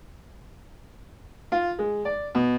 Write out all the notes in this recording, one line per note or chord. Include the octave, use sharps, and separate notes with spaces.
F4
G#3
D5
B2